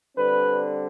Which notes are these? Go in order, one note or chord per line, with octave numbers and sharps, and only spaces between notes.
D3 G3 C4 B4